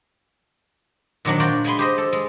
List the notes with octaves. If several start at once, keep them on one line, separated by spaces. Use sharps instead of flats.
A#2 D#3 F#3 D4
F4 F#4 D5 G5
G#3 G#5 B5 C6
G4 C5 D#5
A4
G#3